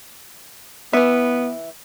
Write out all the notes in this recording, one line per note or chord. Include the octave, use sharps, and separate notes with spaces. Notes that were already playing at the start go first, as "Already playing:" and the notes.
E3 B3 E5